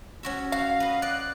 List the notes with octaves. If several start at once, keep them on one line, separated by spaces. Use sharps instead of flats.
C#4 F#4 E5
F#4 F5
B4 D#5
D5 F#6